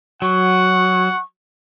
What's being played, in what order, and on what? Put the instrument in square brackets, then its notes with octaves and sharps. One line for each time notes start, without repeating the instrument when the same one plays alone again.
[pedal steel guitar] F#3 [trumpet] F#5 [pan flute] C#6